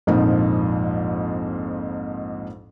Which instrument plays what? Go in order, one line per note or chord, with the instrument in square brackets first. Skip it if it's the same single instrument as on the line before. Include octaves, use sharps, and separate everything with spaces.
[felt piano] A#1 F2 G#2 F3 A#3 D#4